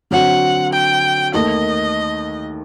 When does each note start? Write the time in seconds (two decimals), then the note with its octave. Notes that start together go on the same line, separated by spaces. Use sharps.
0.11 D3 F#3 C4 F#4 F#5
0.73 G5
1.33 D#2 D#3 A3 D#5